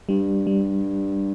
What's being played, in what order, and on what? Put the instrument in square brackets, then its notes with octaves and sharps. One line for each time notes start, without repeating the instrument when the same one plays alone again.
[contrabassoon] G2 [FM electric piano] G3
[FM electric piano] G3